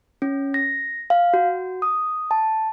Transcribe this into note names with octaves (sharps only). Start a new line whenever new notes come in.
C#4
A#6
F5
F#4
D#6
A5